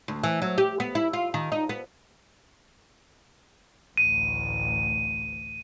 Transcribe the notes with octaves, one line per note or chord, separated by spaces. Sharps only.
D2
E3
F#3
G4
B3
E4
F4
D#3
D#4
B3
A1 D2 D#7